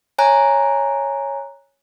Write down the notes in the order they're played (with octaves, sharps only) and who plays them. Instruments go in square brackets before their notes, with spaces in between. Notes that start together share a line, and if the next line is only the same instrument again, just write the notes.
[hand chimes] C#5 G#5 A#5 F#6